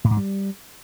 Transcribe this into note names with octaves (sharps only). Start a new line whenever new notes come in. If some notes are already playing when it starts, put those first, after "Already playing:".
A2
G#2
G3